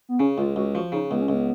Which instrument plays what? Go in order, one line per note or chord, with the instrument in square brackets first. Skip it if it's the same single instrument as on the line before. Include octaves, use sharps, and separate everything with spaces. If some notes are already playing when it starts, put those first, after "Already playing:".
[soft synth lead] B3
[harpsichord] C#3 [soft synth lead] C#4
[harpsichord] C#2 [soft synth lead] F4
[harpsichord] C#2 [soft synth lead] F#4
[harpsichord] F3 [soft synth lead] F#4
[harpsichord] C#3 [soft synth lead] D#4
[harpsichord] C#2 [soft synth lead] B3
[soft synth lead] C#4
[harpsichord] C#2
[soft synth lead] B3